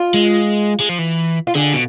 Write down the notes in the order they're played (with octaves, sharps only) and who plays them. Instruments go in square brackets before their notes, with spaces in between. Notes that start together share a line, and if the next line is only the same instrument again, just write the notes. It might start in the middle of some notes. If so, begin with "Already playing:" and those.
Already playing: [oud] F4
[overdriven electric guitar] G#3
G#3
F3
E3
[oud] F4
[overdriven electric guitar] D3 [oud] G#4
[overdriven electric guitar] B2